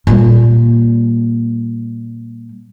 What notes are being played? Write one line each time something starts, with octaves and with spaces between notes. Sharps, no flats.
A#2 G3